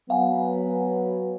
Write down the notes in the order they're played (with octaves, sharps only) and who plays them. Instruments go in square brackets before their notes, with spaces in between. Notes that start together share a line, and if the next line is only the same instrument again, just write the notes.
[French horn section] F#3 B3 [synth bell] F5 F#5 G#5